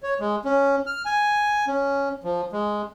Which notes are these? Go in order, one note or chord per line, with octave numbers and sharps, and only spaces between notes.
C#5
G#3
C#4
F6
G#5
C#4
F3
G#3